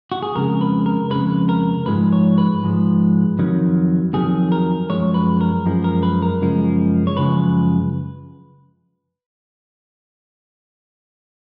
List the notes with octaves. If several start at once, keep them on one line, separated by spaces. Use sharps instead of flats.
F#4
G#4
F2 C#3 G#3 A#4
B4
A#4
F2 C#3 G#3 B4
A#4
G#2 F3 G#3 B4
C#5
B4
G#2 F3 G#3
F2 D#3 F#3
F2 D#3 F#3 G#4
A#4
F#2 F3 G#3 C#5
B4
A#4
F#2 F3 G#3
A#4
B4
A#4
F#2 C#3 F3 G#3
C#5
F#2 C#3 F3 G#3 B4